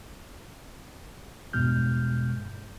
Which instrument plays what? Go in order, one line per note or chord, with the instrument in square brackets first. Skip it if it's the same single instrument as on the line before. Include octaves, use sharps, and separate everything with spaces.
[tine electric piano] E2 G2 B2 G#3 F6 G6